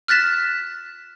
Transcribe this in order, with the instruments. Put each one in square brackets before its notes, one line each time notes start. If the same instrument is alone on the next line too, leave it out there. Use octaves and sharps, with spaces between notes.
[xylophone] F6 F#6 A6 B6 E7